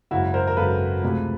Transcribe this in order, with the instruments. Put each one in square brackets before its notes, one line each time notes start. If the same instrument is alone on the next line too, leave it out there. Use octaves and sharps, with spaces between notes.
[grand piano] G#1 F#2 C#3 E4 F#4
A#4 C5
A#4
G#1 F#2 C#3 A4 B4
D2 C3 F3 G#3